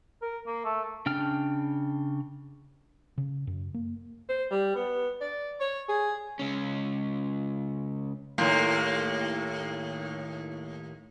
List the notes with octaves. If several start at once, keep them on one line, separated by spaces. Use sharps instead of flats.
A#4
A#3
A3
C#3 D4 G5 F6
C#3
F#2
A#3
C5
G3
B3
D5
C#5
G#4
C#2 C#4
D#2 A2 A#3